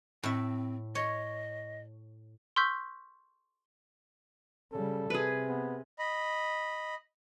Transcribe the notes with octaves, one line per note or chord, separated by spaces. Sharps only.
A2 C4 E5
C#5 D#5
C6 C#6 E6 F6 G6 B6
C#3 G3 A4
C3 G#4 B4
B3
D#5 B5